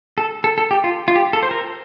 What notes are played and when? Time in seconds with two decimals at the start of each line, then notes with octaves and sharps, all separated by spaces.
0.18 A4
0.44 A4
0.58 A4
0.71 G4
0.84 F4
1.08 F4
1.16 G4
1.33 A4
1.43 C5
1.51 A#4